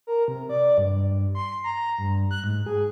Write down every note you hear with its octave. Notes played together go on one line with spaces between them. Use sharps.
A#4
C3
D5
G2
C6
A#5
G2
F#6
G#2
G#4